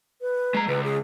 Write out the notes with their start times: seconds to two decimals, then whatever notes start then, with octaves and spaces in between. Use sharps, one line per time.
0.22 B4
0.54 G#3 A#5
0.68 C#2 B4
0.84 G#4